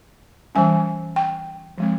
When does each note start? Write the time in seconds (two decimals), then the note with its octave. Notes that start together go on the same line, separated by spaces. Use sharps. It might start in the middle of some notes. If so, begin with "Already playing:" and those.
0.55 E3 G3 C#4 G#5
1.16 G5
1.78 F3 G#3 C4